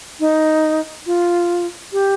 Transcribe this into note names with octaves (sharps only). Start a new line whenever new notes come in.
D#4
F4
G4